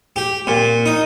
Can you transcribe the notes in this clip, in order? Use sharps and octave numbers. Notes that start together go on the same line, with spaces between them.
G4
A#2
D#4